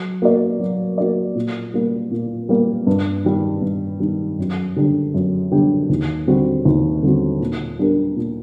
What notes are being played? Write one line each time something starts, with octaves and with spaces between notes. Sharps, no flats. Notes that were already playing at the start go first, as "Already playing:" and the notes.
Already playing: F#3
A#3 F#4 A#4 D5
F#3
A#3 F#4 A#4 D5
A#2
G3 A#3
A#2
G3 A#3
G2
D#3 G3
G2
D#3 G3
F#2
D3 G3 D4 G4
F#2
D3 G3 D4 G4
D#2
D3 G3 C4 F#4
D#2
D3 G3 C4 F#4
A#2
G3 D4 G4 A#4
A#2